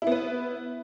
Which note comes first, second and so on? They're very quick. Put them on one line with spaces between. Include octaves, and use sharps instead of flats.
E4 B3 B4